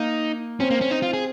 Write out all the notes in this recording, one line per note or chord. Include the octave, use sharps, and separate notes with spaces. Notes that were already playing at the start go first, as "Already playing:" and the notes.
Already playing: A#3 D#4
C4 C#4
A#3
C#4
D#4
F4
G#4